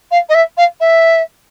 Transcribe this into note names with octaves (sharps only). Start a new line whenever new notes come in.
F5
D#5
E5
F5
E5